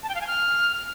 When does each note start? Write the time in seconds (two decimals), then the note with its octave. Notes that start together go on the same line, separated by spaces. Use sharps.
0.03 A5
0.09 G5
0.15 F5
0.21 G#5
0.27 F6